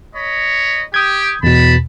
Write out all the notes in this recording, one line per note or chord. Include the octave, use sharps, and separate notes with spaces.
C#5 D#5 B5
G4 D#6 G6 G#6
E2 B2 A5 B5